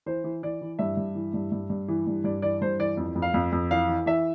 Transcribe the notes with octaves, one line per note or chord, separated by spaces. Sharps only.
E3 C5
E3
E3 D5
E3
G2 E5
G2
E3
G2
G2
G2
E3
G2
G2 D5
E3 D5
G2 C5
E3 D5
F2
F2
F5
F2
F2
E3 F5
E3
E3 E5